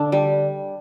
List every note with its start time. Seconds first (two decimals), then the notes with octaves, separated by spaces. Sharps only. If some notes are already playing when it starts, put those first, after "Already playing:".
Already playing: D3 D4
0.12 G3